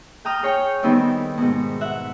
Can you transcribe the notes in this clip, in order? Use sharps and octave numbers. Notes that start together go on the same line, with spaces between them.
G5 A#5 D#6 F6 G6
G#4 C#5 G5 C#6
D#3 G3 B3 C4 D#4 E4
G#2 B2
E5 F#5